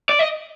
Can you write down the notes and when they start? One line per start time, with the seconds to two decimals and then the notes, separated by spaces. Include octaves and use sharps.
0.09 D5
0.19 D#5